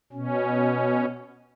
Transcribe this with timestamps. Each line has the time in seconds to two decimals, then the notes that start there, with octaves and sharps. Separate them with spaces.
0.13 B2 C#4